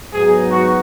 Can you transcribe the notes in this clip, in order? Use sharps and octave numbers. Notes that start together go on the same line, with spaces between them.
G#2 F#3 B3 D#4 G#4
F#4